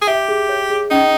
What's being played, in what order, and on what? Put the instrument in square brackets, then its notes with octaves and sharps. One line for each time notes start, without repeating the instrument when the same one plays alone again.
[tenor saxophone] G#4
[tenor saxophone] G4 [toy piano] E5
[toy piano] G#4
C#5
G#4
[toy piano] C#4 [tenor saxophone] D#4